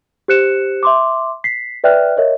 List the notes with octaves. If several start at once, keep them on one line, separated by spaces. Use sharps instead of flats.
G4 C5 F#6 C#7 E7
E5 C6 D6
B6 C7
B4 D5 E5 G5 F6 F#6
A#4 C#5 D#5 E5